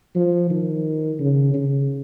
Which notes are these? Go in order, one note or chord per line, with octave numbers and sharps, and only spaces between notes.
F3
D#3
C#3
C#3